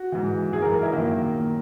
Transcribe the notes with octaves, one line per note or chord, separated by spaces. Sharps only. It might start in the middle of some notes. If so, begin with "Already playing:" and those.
Already playing: F#4
G#2 E3
F#2 E3 G#4
A#4
A#4
E4
F#2 D#3 A#3
A#2